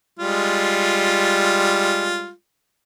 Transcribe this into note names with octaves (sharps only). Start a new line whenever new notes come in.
G3 G#3 F4